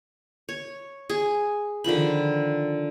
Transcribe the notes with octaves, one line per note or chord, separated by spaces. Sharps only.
C#5
G#4
D3 D#3 F3 B5